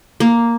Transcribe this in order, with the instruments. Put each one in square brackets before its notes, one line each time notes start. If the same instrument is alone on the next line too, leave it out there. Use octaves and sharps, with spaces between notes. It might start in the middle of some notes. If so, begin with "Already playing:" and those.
[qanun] A#3